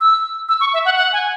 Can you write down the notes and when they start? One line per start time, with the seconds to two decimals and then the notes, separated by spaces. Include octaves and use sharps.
0.01 E6
0.49 E6
0.60 C#6
0.73 E5
0.85 F#5
0.97 F#5
1.13 G#5